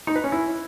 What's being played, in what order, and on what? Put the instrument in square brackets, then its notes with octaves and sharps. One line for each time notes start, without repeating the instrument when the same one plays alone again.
[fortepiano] D#4
B4
C#4
E4